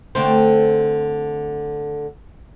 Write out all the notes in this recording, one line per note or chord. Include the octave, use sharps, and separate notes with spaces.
D3 A3 C4